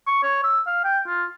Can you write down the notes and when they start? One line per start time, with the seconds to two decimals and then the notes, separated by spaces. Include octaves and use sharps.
0.07 C#6
0.23 C#5
0.44 E6
0.67 F5
0.85 G5
1.07 F4